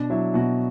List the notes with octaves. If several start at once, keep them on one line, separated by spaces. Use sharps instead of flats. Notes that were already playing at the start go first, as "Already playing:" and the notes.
Already playing: B2 D4
F#3 E4
B2 F#4